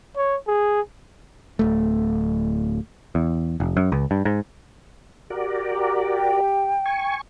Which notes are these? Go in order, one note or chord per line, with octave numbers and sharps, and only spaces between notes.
C#5
G#4
D1 A3
E2
F1
F#2
C#2
G2
G#2
F#4 G4 A#4 D5
G5
G#5 C#6